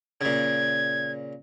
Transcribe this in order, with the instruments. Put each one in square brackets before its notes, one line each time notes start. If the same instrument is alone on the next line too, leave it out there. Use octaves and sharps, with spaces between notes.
[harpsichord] A#2 C#3 [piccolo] G#6